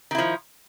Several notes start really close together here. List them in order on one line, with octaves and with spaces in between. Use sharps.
D#3 E4 F3